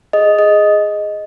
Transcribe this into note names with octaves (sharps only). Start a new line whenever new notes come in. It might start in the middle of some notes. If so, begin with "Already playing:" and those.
G#4 D#5
G#4 D#5